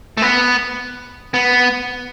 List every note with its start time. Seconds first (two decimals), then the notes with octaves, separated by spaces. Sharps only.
0.17 A3
0.22 B3
1.34 B3